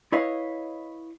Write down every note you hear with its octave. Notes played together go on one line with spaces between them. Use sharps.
E4 B4 C#5 D#5 F5